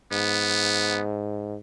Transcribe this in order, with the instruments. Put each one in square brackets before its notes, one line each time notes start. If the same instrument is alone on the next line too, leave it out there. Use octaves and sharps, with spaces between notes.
[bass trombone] G#2 [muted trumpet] B3